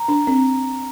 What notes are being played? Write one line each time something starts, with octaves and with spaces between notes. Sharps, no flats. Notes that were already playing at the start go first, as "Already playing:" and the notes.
Already playing: A#5
D4
C4